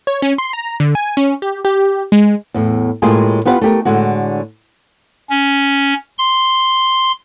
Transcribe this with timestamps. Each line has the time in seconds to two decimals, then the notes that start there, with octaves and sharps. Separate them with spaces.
0.07 C#5
0.22 C#4
0.38 C6
0.53 A#5
0.80 D3
0.95 G#5
1.17 C#4
1.42 G4
1.65 G4
2.12 G#3
2.54 E2 A2
3.02 A2 G#3 A#3 F4 G4 G#4
3.45 B3 F4 G4 B4 F#5
3.61 A3 G4 A#4
3.85 A2 D3 G#3 F#4
5.30 C#4
6.18 C6